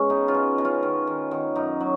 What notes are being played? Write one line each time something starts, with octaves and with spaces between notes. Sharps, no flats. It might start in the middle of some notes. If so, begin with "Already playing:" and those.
Already playing: G#3 B3 C#4
B2 D#4
C#4 F4
B2
B2
C#4 F4
D#3
D#3
D#3
F#2 D#4
F#3